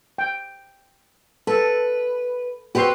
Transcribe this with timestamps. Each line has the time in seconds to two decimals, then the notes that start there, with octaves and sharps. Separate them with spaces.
0.18 G5
1.47 A4 B4
2.75 C4 F#4 G4 B4 C6